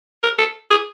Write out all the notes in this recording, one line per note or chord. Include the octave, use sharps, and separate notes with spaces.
A#4
A4
G#4